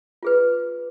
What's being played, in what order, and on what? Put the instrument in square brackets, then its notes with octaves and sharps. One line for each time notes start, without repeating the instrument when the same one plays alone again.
[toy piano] F4 G#4 B4